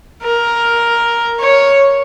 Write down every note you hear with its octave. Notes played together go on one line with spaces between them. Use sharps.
A#4
C#5